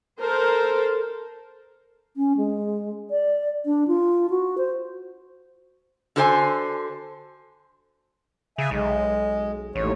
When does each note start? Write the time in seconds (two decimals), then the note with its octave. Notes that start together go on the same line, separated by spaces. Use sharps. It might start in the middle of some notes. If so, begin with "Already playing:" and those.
0.19 A4 A#4 C5
2.17 C#4
2.37 G#3
3.10 D5
3.66 D4
3.88 F4
4.30 F#4
4.58 C5
6.16 D3 F#4 A4 C5 D5 G#5
8.58 C#3 E5 G#5
8.71 B1 G#3
9.75 A1 D#2 A2 C#5